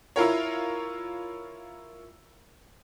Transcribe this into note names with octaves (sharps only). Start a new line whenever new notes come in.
E4 F4 A#4 C#5